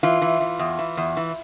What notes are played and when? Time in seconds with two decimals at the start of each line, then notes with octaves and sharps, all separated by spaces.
0.03 E3 F4
0.22 E3
0.41 E3
0.59 E2
0.79 E3
0.97 E2
1.17 E3